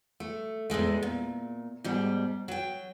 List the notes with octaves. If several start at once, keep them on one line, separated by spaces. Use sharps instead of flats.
A3
E2 A2 G#3 A3
A#2
G#2 B2 G3
F#3 G5